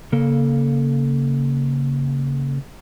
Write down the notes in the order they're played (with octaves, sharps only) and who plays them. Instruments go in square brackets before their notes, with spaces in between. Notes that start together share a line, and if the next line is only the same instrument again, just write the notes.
[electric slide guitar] C#3 A#3 A4